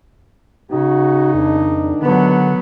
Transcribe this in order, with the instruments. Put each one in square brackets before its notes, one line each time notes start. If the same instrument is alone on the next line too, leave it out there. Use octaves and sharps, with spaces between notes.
[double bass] C#3 [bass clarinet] D#4 [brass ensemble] F#4
[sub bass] F2 [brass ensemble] G#2 D#3 D4
[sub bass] D3 [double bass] F#3 B3